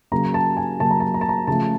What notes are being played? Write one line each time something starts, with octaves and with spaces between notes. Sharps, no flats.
C#3 F#3 A#3 A#5
A5
G#5
C#3 F#3 A#3 A5
A#5
A5
A#5
A5
A#5
C#3 F3 A3 A5